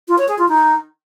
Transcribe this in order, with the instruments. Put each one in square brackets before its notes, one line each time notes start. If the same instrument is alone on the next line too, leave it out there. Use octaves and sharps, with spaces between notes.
[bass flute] F4
C#5
G#4
F4
D#4